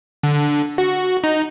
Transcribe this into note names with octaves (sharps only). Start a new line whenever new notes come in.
D3
F#4
D#4